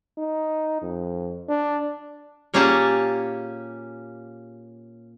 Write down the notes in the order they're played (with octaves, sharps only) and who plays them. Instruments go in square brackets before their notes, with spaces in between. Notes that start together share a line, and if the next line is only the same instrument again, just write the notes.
[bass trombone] D#4
F2
D4
[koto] A#2 A#3 C#4 G4 G#4 A5